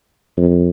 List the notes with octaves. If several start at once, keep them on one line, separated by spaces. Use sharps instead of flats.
F2